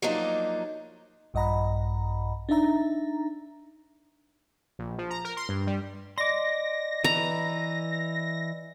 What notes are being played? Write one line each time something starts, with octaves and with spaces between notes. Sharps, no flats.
F3 F#3 A#3 D4 D#4
A#1 G2 D#5 F#5 A#5 B5
D4 D#4 E5 A#5
A#1
F3
A#5
A#4
C6
G2
G3
D5 D#5 C6 D6 A#6
E3 B4 A#5